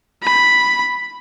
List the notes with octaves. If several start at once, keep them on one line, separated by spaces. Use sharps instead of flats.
B5